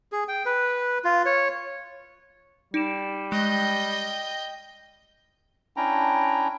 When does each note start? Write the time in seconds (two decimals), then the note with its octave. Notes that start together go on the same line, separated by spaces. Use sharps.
0.12 G#4
0.28 G5
0.46 B4
1.04 F4
1.26 C#5
2.74 G3 D#4 D7 E7
3.32 G#3 D#5 G5
5.77 C#4 D4 E4 G5 A#5